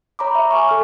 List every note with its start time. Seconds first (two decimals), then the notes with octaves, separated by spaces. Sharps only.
0.19 C#5 A#5 B5 D6
0.35 E5
0.50 G#5 C6 C#6
0.69 A4 F6